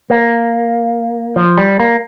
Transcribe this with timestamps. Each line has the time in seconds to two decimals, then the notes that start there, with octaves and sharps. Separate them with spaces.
0.10 A#3
1.36 F3
1.58 G3
1.80 A#3